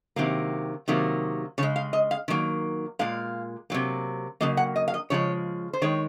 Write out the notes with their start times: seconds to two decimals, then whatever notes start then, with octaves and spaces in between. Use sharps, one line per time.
0.16 C3 D#3 F#3 A#3
0.88 C3 D#3 F#3 A#3
1.58 C#3 C#5
1.63 G#3
1.76 F5
1.93 D#5
2.11 F5
2.28 D#3 F#3 A#3
2.99 A#2 G#3 F5
3.70 C3 F#3 A#3
4.41 C#3 F#3 A#3 D#5
4.57 F#5
4.76 D#5
4.88 F5
4.94 D#5
5.10 C#3 F3 G#3 C#5
5.73 C5
5.82 D#3 G#3 C#5